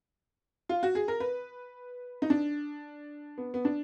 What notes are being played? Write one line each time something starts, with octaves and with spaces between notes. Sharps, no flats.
F4
F#4
G#4
A#4
B4
D#4
D4
B3
B3
D4